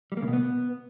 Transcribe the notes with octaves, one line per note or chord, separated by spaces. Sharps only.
G3
A#3
C#3
B2
B3